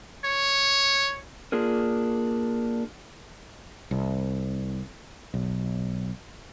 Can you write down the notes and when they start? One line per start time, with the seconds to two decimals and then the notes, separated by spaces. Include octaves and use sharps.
0.25 C#5
1.52 A#3 D4 F4 G#4 A#4
3.91 C2
5.34 B1